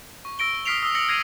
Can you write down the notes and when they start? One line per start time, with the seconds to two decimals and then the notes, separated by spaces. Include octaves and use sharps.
0.25 C#6
0.39 E6 A#6 D7 G7
0.65 D#6 F6 B6 C7 D7 F7
0.83 D#6 E6 G7
0.95 D#6 E6 A#6 C#7 F#7
1.08 F6 G#6 A#6 C7 D#7